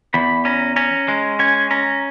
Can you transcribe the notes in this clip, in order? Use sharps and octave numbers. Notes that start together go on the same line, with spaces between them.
E2 B5
C#4 A#5
C#4 A#5
G#3
C#4 G#5
C#4 A#5